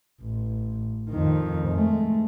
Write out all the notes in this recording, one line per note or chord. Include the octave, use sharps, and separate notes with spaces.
A1
F2 D#3
G#3 A3